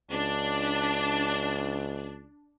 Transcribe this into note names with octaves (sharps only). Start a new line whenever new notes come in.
C#2 D4